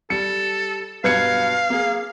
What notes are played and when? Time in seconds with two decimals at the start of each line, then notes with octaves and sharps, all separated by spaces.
0.10 G3 A4 C#7
1.04 G2 B2 F#3 B4 F5 G#6 C#7
1.70 A#3 G#4